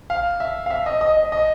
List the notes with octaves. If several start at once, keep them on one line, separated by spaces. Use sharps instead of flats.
F5
E5
F5
E5
D#5
D#5
D#5
D#5